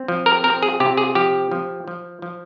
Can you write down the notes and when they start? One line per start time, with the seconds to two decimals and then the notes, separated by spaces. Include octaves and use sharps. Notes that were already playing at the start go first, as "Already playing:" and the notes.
Already playing: C4
0.08 F3
0.26 A#4
0.44 C4 A#4
0.63 G#4
0.80 C3 G4
0.97 G#4
1.15 F3 G4
1.52 F3
1.88 F3
2.22 F3